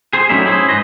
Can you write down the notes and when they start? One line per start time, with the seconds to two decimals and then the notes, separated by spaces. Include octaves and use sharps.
0.13 G#4 C5
0.29 F#3 G3 A3 C#4 D#4 E4
0.45 C#4 E4 G#4 C5
0.69 G#2 B4 C5 D#5